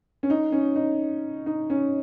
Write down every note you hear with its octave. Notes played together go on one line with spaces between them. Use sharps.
C#4
D#4
C#4
D#4
D#4
C#4